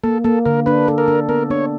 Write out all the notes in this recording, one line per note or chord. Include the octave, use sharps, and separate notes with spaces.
A#3 A4
A#3 A4
D3 A#4
D4 B4
A4
A#4
D4
B3 A#4
D4 C#5